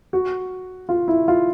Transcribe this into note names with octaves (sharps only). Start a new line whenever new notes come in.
F#4
F4
E4
F4